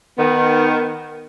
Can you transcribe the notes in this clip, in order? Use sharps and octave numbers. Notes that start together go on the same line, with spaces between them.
D#3 B3